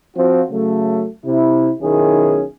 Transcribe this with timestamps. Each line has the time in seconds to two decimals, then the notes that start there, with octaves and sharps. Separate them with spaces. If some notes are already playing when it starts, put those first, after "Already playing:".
0.16 F3 C4 F4 F#4
0.50 C#3 F#3 A3
1.25 C3 E4
1.81 B1 D#3 C#4 E4 G#4